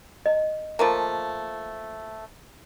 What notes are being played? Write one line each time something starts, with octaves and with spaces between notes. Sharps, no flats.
D#5
F3 A3 A#3